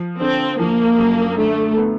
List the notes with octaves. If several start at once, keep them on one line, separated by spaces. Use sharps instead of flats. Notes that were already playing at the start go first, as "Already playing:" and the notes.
Already playing: F3
D3 C4
F3 A#3
F#2
D3 A3
B3